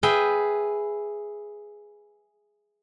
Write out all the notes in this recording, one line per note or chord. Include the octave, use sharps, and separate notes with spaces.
G#4 B4 E5 G5